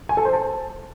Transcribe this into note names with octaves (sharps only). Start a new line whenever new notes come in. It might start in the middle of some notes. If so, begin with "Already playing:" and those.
G#5
A4
C5
A5